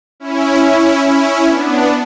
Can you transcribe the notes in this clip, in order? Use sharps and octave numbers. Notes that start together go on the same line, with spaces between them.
C#4 E4
C#4 E4
C#4 E4
B3 D4